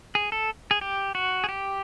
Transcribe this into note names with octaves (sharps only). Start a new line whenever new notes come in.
G#4
A4
G#4
G4
F#4
G#4
G4